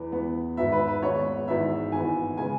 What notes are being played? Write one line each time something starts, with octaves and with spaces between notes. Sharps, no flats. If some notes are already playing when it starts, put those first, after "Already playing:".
Already playing: E2 E3 B3
E2 E3 B3
G#1 G#2 G#3 B3 E5
B4
B4
G#1 G#2 G#3 B3 C#5
G#1 G#2 E3 B3 E5
G#1 G#2 E3 B3 G#5
C#3 G#3 B3 G#5